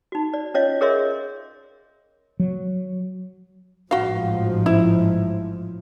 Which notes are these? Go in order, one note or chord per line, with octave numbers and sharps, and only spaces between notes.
D#4 F#4
D5
C#4 F4 C#5 D#5 F5
G#4 A#4 C#5 D#5 E5 C6
F#3
A1 G#2 F3 F#4 F5
E4